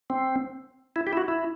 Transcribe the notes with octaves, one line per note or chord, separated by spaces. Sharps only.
C4
E4
G4
E4
F#4
E4